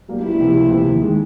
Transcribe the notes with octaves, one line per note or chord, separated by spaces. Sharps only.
F#3 A#3 D4 G4
C#2 E4
C3 F3 A#3
C#2
C3 F3 A#3
D#2
D#3 G#3